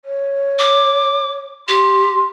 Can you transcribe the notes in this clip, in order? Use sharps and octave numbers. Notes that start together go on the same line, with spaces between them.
C#5
D6
G4 C6